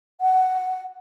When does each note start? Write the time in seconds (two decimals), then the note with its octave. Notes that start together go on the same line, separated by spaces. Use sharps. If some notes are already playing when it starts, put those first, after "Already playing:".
0.21 F#5